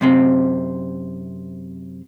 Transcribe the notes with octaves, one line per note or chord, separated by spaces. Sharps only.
F#2 C3 C4